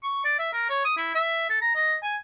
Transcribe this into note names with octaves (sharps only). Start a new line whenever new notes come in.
C#6
D5
E5
A#4
C#5
D#6
E4
E5
A4
A#5
D#5
G#5